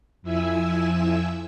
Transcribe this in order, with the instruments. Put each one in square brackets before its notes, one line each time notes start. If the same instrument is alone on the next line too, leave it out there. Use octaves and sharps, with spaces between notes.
[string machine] F2 F3 E4 E5 G#5 E6